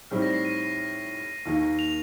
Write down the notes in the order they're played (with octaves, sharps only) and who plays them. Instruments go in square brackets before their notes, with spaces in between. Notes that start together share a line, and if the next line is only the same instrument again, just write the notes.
[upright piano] A2 G3 C4 D#4 [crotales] F6
[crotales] A#6
C7
D#7
[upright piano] D#2 D#3 A#3 D#4
[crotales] F7